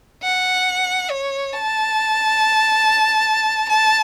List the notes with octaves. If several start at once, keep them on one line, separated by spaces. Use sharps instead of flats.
F#5
C#5
A5
A5